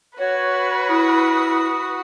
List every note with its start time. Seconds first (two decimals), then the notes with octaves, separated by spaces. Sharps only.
0.19 F#4 B4 C#5
0.89 E4 D#6